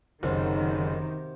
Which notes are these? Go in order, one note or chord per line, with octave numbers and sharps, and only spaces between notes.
F#1 C3 D#3 F#3 C5